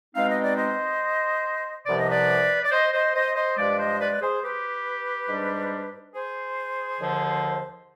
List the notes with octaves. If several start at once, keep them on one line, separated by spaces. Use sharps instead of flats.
B2 G#3 C4 D#4 F5
D#5
D5
C5 D#5
C2 C3 F3 B3 D5
D#5
B4 D5
D5
C5 D#5
C5 D#5
C5 D#5
C5 D#5
G2 F3 G#3 B4 D5
C5 D#5
B4 D5
B4
G#4 C5
G4 B4
G#2 G3 D4
G#4 C5
D#2 D3 F3